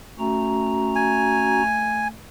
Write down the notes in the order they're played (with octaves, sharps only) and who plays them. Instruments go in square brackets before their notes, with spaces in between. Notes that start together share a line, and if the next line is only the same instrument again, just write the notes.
[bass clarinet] A3 [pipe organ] C#4 F#4 A#5
[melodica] G#5